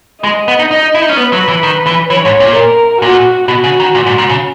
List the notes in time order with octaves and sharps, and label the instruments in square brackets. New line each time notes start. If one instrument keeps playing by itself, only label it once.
[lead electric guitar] G#3 [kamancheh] D#5
[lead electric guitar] B3
D#4
D#4
E4
D#4
C#4
[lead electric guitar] B3 [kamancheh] B4
[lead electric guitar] F#3
E3
D#3
E3
[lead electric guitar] E3 [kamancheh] C#5
[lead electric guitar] G#2
A#2
[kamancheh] A#4
[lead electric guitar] A#2 [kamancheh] F#4
[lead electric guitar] B2 [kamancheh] F#4
[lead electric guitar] C#3
D#3
A#2
G#2
A#2
C#3